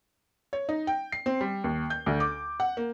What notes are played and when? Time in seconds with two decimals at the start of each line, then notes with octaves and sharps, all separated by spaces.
0.53 C#5
0.69 D#4
0.87 G5
1.12 C7
1.26 C4
1.41 G3
1.64 D#2
1.90 G6
2.06 D2
2.20 D6
2.60 F#5
2.77 A#3